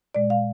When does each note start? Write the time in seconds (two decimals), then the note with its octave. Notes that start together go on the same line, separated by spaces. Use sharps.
0.15 A#2 G#3 D5
0.30 F5